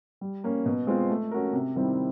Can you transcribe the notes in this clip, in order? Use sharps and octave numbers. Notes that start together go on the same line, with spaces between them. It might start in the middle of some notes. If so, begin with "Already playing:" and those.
G3
A#3 C#4
B2
G#3 C4 F4
A3
C#4 F#4 A#4
C3
D#3 G3 C4 E4